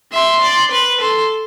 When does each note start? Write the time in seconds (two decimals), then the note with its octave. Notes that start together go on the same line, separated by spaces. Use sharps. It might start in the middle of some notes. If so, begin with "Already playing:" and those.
0.13 E5 C6
0.42 D5
0.72 B4
1.01 A4 C6